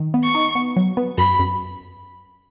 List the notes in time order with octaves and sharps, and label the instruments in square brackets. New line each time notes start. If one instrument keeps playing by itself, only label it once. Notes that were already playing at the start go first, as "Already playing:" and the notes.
Already playing: [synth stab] D#3
B3
[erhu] C#6
[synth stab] D#4
B3
F#3
B3
[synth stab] F#2 [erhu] B5
[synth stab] F#2